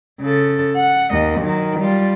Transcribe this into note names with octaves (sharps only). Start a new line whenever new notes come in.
C#3 A4
F#5
D#2 D#5
D#3 F#3
G3 F4